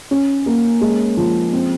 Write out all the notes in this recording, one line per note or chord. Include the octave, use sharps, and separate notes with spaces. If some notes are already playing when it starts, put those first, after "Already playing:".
C#4
A#3
G#3
F3
C4